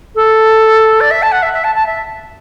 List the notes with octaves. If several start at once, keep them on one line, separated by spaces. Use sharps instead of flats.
A4
D5
E5
A5
F#5
E5
E5
A5
A5
E5